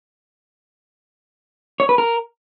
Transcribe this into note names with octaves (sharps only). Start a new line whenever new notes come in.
C#5
B4
A#4